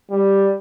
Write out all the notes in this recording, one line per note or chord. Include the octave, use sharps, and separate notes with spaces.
G3